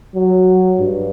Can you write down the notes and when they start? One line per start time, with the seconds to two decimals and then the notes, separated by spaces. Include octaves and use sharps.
0.15 F#3
0.79 G2